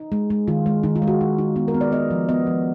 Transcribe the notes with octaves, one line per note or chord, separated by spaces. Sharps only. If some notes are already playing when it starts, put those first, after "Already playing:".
Already playing: D#4
G#3
G#3
D#3 F4
G#3
D#3 D#4
F4
G#3
F#4
D#4
D#4
B3 D#4
A#4
B3
D5
B3 D#5
F3
B3 D#5
F3